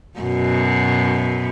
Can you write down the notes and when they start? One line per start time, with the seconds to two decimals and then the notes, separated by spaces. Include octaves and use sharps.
0.19 F#2 B2